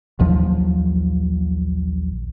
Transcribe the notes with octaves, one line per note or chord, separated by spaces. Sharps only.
A#1 D#2 F3 F#3